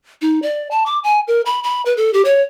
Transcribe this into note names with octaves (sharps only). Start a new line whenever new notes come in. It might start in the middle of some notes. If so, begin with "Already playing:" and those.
D#4
D5
A5
D6
G#5
A#4
B5
B5
B4
A4
G4
C#5